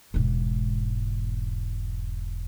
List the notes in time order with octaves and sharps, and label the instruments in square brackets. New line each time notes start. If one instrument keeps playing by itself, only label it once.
[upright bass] E1 G#2